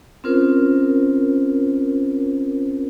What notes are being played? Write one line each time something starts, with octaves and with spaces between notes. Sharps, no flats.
C4 C#4 F4 A#4 C5